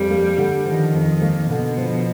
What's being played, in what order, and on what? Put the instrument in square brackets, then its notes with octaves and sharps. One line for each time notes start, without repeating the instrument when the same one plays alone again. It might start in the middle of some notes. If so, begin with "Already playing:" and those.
Already playing: [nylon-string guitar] F2 [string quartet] G3
[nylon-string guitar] A#3
D3
[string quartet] D#3 [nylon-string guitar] F3
[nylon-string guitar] F2
A#3
[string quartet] B2 [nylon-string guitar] D3
[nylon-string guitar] F3